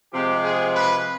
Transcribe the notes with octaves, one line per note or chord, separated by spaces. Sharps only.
C3 F3 G#3 G4
G#4
B4